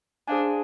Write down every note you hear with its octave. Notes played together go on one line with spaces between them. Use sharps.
D4 G#4 C5 F5 G#5